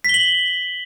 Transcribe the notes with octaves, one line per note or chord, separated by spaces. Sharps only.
B6 F#7 G7